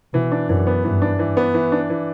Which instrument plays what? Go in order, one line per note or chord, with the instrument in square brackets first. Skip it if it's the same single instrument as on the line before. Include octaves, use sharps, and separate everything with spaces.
[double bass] B2 [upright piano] E3
[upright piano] D4
[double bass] F#2 [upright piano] E3
[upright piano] B3
[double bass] G2 [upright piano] E3
[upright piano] D4
E3
B3
E3
D4
E3